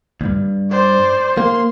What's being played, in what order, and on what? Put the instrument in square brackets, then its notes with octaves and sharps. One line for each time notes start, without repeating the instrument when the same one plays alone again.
[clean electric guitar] D2 G2
[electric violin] C5 D5
[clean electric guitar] A#3 [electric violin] C6